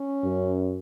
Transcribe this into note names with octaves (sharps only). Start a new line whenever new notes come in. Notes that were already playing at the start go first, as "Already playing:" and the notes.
Already playing: C#4
F#2